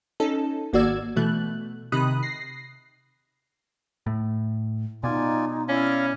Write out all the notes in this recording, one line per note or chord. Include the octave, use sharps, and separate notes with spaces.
C#4 D#4 A4
G#1 A#3 F#4 D5 E6 G#6
B2 E3 A3 F#6
C3 D#3 D#4 B5 D#6 F#6
A#6 C7
A2
B2 D#4 F4 D5 G#5
C#4 E4 D5 F5